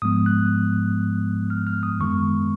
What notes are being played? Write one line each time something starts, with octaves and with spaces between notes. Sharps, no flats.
G#2 F3 G#3 B3 D#6
F#6
F6
F6
D#6
F#2 D#3 G#3 B3 C#6